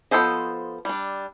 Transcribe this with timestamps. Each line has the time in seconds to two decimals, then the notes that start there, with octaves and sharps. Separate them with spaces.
0.11 F3 B3 A4 C5 D#5
0.85 G3 D4